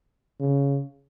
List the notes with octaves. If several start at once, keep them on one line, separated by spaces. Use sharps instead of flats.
C#3